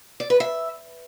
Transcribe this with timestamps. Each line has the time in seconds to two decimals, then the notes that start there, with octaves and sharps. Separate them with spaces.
0.20 D5
0.30 B4
0.40 E5